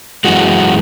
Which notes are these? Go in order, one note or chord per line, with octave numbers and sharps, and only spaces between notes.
F#2 E3 G#3 F#4